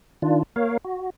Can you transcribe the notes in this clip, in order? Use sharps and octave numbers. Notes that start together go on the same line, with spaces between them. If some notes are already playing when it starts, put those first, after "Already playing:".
D#3 D4 F4
A#3 A#4 C#5 F5
F#4